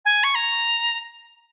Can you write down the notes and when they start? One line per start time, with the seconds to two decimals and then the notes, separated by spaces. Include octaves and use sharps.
0.05 G#5
0.23 C#6
0.35 A#5